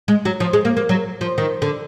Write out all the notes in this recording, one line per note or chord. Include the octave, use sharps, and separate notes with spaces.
G#3
F#3
F3
G#3
A#3
A#3
F#3
F3
D#3
D3